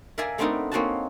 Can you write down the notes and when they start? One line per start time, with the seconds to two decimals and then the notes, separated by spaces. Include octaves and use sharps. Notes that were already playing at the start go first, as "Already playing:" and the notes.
0.18 A#4 D5 E5 F5 G#5 A#5
0.38 A3 B3 C4 D4 D#4 A#4
0.72 A#3 C4 C#4 D#4 F#4 A5